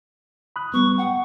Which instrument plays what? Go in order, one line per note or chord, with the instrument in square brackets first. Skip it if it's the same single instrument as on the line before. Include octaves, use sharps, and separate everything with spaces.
[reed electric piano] B5 D#6 F#6
[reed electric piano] G3 B3 [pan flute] C#6
[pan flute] F#5 [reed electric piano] G5